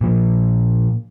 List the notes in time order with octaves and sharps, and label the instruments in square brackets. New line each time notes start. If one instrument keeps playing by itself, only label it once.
[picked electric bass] A#2 F3